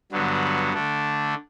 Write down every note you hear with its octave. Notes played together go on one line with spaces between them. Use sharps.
G2 D3 F#3 B3
D3 A3 D4